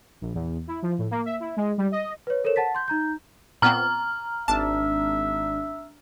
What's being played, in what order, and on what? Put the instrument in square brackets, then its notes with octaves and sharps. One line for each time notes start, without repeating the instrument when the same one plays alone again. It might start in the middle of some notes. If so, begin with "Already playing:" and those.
[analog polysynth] A#1
E2
E4
F3
A2
A#3
E5
E4
G#3
G3
D#5
[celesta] B4 C#5
A4 A#4 C5 C#5 E7
F#5 A5 A6 B6
C6 G6
D#4 A#5 G6
[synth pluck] A#2 B3 C4 [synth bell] A#5 F6
[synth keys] G#1 D4 [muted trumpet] E5 [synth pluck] A5